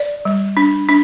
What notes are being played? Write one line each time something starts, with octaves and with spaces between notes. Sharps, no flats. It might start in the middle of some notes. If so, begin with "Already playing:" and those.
Already playing: D5
G3
D4
D4